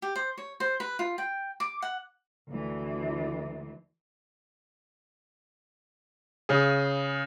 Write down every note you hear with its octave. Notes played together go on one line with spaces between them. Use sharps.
G4
C5
C#5
C5
B4
F4
G5
D6
F#5
D2 E3
C#3 G#4